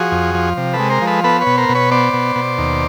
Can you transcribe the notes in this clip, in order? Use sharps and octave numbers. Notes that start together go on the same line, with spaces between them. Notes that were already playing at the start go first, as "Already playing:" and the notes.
Already playing: F3 F#4 G#4
F2
F3
C3
A4 B4
G#3
A#4 C5
F3
A4 B4
B3 A4 B4
B4 C#5
B2
A#4 C5
B2
B4 C#5
B3 C5 D5
B2
B2
D#2